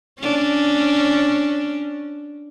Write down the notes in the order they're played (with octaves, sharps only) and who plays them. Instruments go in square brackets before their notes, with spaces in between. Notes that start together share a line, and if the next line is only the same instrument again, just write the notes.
[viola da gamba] C#4 D4